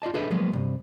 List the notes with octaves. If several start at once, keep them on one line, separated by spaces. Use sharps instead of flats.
F4 D5 D#5 A5
D4 G#4 A4 B4 D#5 E5
F3 F#3 G#3 A#3 B3
E2 G2 C3